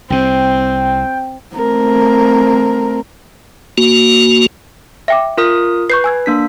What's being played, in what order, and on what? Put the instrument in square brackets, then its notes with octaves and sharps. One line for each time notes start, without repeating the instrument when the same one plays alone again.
[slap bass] C2 C3 [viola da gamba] C4 [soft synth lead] G5
[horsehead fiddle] A3 C4 [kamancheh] A#4
[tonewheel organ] A#3 F#4
[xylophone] E5 G5 D6
[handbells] F4 A#4 D#6
[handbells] B4 [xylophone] C#6 G6 C7
[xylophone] G#5 E6 G#6
[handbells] A#3 D4 B6